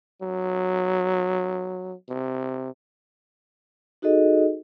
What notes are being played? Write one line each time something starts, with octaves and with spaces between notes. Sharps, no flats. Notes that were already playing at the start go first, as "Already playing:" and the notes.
F#3
C3
D#4 F#4 G#4 A4 D#5